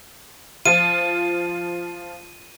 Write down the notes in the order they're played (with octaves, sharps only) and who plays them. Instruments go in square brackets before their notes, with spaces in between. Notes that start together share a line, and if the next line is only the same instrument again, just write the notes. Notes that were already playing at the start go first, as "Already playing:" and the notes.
[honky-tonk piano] F3 F4 [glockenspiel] D#7